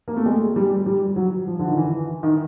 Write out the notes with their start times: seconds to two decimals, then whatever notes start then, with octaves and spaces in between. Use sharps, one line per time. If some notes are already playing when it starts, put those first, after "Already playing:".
0.08 A#3
0.16 A3
0.26 G#3
0.56 G3
0.86 G3
1.16 F#3
1.47 F3
1.59 D3
1.68 D#3
1.77 E3
2.23 D#3